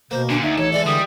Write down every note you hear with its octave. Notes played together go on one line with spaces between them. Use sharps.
B2 A#3 C5
A#2 D3 D4
D2 D#4 E5
A1 A4 C#5
E3 G#3 D5
D3 G3 D#6